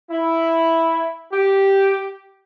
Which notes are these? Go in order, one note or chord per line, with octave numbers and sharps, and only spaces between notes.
E4
G4